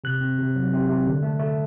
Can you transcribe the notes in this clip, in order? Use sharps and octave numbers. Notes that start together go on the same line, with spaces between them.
C3 F#6
C4
C3
F#3
C3
C3
D3
A3
A3